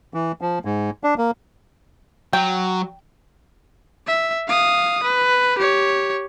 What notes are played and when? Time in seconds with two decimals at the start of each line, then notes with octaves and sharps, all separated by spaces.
0.14 E3
0.41 F3
0.65 G#2
1.04 D4
1.18 A#3
2.33 F#3 G5
4.07 E5
4.48 F5 D#6
5.04 B4
5.58 G4 C#5